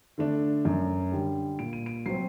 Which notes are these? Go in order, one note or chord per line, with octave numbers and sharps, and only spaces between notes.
D3 A3 D4
F#2
D3 G3
A#2 D7
D#7
D7
F#3 C4 C7